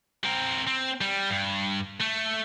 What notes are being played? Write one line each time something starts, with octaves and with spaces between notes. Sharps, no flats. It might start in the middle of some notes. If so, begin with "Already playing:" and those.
C4 A#4
C4
G3
G2
A3